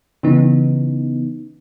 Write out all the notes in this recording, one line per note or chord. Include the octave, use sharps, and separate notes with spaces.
C#3 E3 B3 D#4